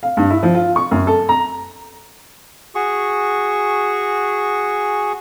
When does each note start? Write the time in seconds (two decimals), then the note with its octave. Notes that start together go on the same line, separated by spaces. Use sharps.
0.03 F5
0.17 G2
0.30 E4
0.43 F3
0.55 F4
0.76 C#6
0.91 F#2
1.07 A4
1.29 A#5
2.75 F#4 G#4 C#6